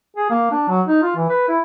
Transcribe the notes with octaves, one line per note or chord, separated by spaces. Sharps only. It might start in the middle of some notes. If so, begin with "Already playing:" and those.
G#4
A#3
D4
F#3
D#4
F4
E3
B4
E4